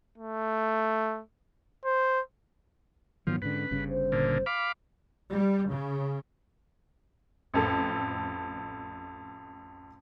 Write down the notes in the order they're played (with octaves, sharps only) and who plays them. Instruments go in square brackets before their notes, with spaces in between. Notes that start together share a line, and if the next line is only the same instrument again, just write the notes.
[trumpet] A3
C5
[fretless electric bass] G#2 D#3 F#3 [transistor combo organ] F3 [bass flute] B3
[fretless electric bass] G#2 D3 [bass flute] C#4 [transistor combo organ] B4
[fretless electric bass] G1 G2 C#3
[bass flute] C5
[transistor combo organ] A#2 D3
F5 B5 D6
[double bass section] G3
C#3
[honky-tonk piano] A1 F2 A4